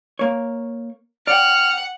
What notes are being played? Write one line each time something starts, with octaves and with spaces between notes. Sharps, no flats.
A#3 C#5
D5 F#5 G5 F6